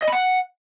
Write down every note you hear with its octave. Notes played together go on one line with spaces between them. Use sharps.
D#5
B5
F#5